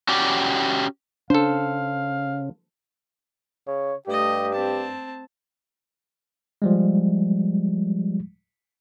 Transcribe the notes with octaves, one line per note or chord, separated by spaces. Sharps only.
C#4 F#4 G4 D5
C#3 C#4 D4 A4 C5 F5
C#3 C#5
G2 A3 G4 D#5
C4 A5
F3 G3 G#3